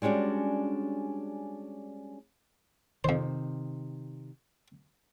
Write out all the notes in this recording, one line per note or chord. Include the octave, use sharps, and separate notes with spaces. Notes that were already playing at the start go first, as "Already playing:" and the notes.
G3 G#3 C#4 D4 F#4
F2 C3 D#3 C5